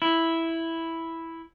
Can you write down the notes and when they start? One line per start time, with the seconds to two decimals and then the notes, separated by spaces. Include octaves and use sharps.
0.02 E4